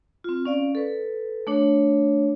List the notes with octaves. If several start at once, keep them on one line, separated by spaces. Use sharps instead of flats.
C4 F4
C#4 D5 F5
A4 B4
A3 D4 C#5